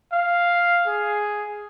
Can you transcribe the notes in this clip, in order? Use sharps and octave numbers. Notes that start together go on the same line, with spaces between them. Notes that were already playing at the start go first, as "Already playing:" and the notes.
F5
G#4